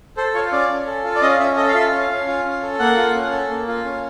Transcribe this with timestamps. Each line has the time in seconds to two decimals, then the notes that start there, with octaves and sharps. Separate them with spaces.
0.17 A4 C5
0.34 F4 C#5
0.52 C#4 D5
0.69 C#4
0.87 A4
1.04 F4
1.15 D5
1.22 C#4 D#5
1.39 C#4 E5
1.57 A4 D#5
1.68 F5
1.74 F4 E5
1.92 C#4
2.01 F5
2.09 C#4
2.27 F4
2.45 C#4
2.62 A4
2.79 A#3 F#5
2.97 F4
3.15 C#4
3.32 A4
3.50 A#3
3.67 F4
3.85 C#4